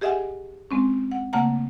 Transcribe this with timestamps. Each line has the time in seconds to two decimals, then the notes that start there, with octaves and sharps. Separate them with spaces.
0.01 G4 G#4 D#5 E5 F#5 G#5
0.71 G#3 C4 C#4
1.12 F#5
1.33 C#3 A3 A#3 F#5 A5 A#5